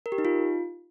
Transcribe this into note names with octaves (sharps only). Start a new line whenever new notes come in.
A#4
G4
D#4
F4